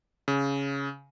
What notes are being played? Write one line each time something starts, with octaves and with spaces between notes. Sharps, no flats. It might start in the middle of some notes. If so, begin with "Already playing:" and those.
C#3